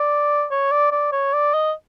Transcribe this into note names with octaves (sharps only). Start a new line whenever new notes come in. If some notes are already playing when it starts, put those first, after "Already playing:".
Already playing: D5
C#5
D5
D5
C#5
D5
D#5